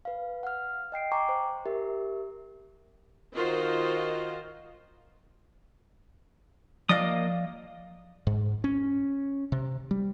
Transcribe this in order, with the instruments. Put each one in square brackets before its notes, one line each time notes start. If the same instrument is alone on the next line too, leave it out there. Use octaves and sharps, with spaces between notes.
[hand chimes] B4 F5
F#5 F6
D#5 G5 C7 D7
G5 G#5 A#5 C#6 D6
C5
G4 A#4 E5
[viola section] D#3 F4 F#4 A#4 C5 D#5
[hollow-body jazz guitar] F3 D5 F5 [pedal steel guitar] A#3 D#5 D#6
[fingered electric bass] G#2
C#4
C3
G3